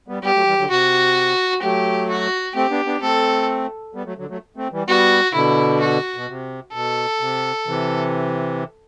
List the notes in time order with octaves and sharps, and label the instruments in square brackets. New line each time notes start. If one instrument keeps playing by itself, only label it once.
[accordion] G3 B3
[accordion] G3 B3 [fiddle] G4
[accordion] F#3 A3
E3 G3
D3 F#3
[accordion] C3 [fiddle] F#4
[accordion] F#3 A3 [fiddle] G4
[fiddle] F#4
[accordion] A3 C4 [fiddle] G4
[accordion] B3 D4
B3 D4
[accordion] A3 C4 [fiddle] A4
[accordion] G3 B3
F#3 A3
D3 F#3
F#3 A3
A3 C4
E3 G3
[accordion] G3 B3 [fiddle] F#4
[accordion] B2 D3 [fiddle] E4
[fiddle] F#4
[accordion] B2
C3
[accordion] B2 [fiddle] A4
[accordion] C3
C3 E3